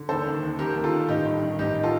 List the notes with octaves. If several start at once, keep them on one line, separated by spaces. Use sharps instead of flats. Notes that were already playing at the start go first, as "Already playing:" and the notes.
Already playing: D3
D#2 A4 C5
D#3
D#2
D#3 G4 A#4
D#2
F4 A4
D#3
A1 D#4 G4
G2
D#3
A1 D#4 G4
F4 A4